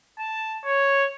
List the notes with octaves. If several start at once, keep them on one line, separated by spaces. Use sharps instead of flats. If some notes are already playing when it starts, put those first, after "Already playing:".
A5
C#5